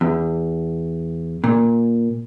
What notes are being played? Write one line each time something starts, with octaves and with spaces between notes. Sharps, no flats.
E2
A#2